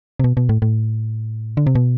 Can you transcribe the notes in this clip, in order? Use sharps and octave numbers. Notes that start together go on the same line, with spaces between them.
C3
B2
B2
A2
A2
D3
C3
B2